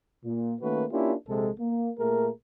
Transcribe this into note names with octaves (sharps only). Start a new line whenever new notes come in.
A#2
D#3 A3 A#3 C#4 F#4 B4
A#3 C#4 D4 E4 F4 G4
A#1 C3 G#3 A4
A#3
A#2 A3 A#3 G#4 A#4